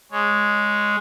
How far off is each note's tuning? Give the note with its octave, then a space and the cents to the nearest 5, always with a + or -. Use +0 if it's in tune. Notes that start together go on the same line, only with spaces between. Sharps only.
G#3 +0 C#5 +0